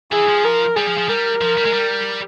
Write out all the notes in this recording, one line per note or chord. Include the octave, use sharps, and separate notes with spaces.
E3 G#4
F3
A#4
G3 G#4
F3
F3
G3 A#4
F3
G3
G#3
G3